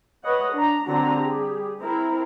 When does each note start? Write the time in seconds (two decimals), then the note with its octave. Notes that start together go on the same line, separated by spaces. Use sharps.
0.24 B4 C#5 D#5 F#5
0.53 D4 A#5
0.86 D3 F#3 C4 D4 F#4 A#5
1.16 G3 G4 G#4
1.81 C4 E4 A#4